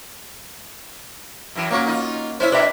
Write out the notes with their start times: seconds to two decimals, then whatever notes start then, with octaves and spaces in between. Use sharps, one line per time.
1.55 F#2 E3
1.71 A#2 A#3 C#4 F#4
1.86 D#4 F4
2.40 C#4 E4 C5 E5
2.52 B2 D4 B4 E5